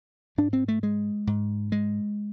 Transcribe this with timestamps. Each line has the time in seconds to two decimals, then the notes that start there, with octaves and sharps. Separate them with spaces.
0.38 G#2 D4
0.53 C4
0.68 A3
0.83 G#3
1.27 G#2
1.72 G#3